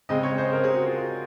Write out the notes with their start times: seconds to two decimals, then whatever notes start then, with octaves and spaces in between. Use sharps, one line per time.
0.09 C#3 G#3 C4 D#5
0.23 C#5
0.38 C5
0.53 A#4
0.64 G#4
0.74 F#4
0.86 F4